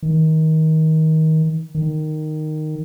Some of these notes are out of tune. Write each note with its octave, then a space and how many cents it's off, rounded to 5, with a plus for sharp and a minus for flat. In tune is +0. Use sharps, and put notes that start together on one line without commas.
D#3 +25
D#3 -10